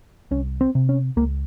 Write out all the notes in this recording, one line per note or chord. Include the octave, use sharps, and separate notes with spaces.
C2 C#4
C4
C3
C#4
C#2 A#3